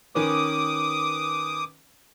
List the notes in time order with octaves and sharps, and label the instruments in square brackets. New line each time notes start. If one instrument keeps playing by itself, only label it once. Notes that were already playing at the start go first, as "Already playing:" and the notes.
[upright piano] D#3 C#4 B4 [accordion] D6 D#6